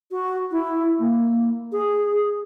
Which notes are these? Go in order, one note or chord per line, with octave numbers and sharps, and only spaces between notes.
F#4
E4
A#3
G#4